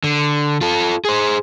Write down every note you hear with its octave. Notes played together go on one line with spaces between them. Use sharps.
D3
F4 A4
G#4 C5